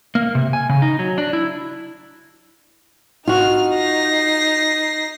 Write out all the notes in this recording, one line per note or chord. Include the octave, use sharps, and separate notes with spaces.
A#3
C3
G#5
C#3
D#4
F#3
D4
E4
D#4 F4 F#4 F6
A#6 C7